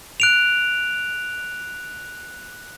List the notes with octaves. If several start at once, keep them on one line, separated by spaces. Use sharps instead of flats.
F#6 D7 F7